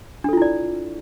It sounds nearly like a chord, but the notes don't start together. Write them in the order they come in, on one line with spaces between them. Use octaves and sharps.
D4 A4 F4 E4 D5